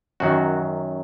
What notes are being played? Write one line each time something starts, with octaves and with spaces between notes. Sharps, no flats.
F#2 D#3 F#3 F#4